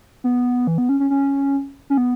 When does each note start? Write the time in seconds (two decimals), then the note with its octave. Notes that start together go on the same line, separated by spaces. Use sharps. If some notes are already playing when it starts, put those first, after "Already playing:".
0.24 B3
0.67 E3
0.78 B3
0.89 C#4
1.00 C#4
1.10 C#4
1.90 C#4
1.97 B3